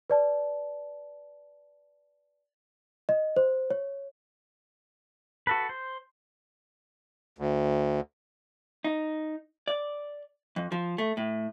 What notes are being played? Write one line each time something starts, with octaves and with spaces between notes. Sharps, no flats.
B4 D5 A5
D#5
C5
C#5
F#4 A4 B4
C5
D2
D#4
D5
F2
F3
A3
A2